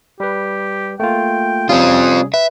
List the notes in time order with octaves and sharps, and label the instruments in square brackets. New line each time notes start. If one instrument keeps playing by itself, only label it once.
[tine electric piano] G3 B4 [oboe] G4
[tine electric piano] A3 A#3 F4 [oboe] G5
[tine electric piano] C3 G3 C#4 [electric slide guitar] C4 F4 [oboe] G#4
[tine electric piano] B4 [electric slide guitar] E5